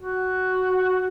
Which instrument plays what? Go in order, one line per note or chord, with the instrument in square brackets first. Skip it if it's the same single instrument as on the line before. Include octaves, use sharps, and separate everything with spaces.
[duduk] F#4